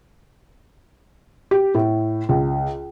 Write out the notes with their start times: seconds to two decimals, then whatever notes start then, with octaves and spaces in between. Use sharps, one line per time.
1.51 G4
1.75 A2
2.29 C#2